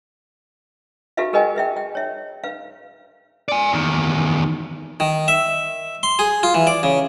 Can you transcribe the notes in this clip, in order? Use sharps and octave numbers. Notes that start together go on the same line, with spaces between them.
F#4 G4 A4 B4 E5 F5
G#4 A#4 B4 D#5 G5 G#5
B4 E5 G5
G5
C#5 E5
B4 F5
D5 G#5
E2 D#3
D#3
E5
C6
G#4
F4
E3
D5
C#3